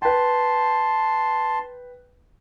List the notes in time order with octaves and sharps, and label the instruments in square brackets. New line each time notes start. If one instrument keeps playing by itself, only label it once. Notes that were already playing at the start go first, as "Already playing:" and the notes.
[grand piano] B4 G5 [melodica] A5 C6